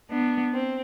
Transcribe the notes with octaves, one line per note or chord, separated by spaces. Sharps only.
B3 D4
C4